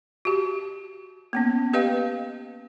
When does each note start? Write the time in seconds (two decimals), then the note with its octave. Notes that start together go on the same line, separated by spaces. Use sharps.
0.25 F#4 G4
1.33 A#3 B3 C#4
1.73 G4 B4 D#5 F5 G5